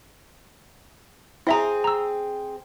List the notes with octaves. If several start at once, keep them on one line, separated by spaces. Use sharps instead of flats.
C4 E4 G#4 E5 A#5
A#5 E6